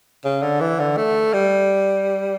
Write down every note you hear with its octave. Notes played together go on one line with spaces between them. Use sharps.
C#3
D3
E3
D3
A3
G3